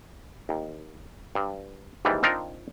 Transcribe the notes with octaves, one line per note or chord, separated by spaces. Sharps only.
D#2
G2
D#2 G#2 E3 G3
C4 D4 D#4 F4 A#4